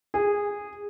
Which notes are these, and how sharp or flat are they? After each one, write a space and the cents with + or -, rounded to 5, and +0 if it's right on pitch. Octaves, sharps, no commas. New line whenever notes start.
G#4 -15